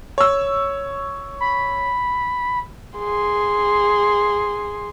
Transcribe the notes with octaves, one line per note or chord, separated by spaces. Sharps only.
C#5 E6
B5
G#4 C6